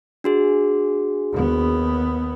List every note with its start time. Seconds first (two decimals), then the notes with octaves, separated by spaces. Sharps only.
0.24 D4 F#4 G#4
1.32 D#2 B3